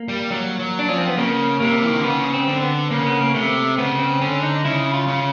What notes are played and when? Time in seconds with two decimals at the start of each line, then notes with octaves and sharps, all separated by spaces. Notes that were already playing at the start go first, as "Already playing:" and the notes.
Already playing: A#3
0.09 G3
0.31 F#3
0.59 F#3
0.79 D4
0.88 F3 C#4
0.98 C4
1.08 B3
1.17 C#3 A#3
1.60 C3 A#3
1.83 E3
1.90 D#3
1.97 D3
2.04 C#3 B3
2.33 C4
2.48 D3
2.62 B3
2.90 C#3 A#3
3.06 B3
3.21 A#3
3.34 C3 A3
3.78 C#3 B3
3.99 C4
4.21 D3 C#4
4.43 D#4
4.65 C#3 E4
4.94 F4
5.07 C#3